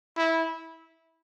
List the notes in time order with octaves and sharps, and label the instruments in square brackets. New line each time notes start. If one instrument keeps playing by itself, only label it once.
[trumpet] E4